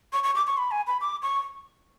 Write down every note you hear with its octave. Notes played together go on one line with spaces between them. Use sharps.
C#6
C#6
D6
C#6
B5
G#5
B5
D6
C#6